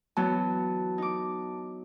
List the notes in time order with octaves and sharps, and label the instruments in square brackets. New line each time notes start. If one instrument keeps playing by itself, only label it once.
[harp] E3 F#3 B3 [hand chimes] A5
[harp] D#4 D6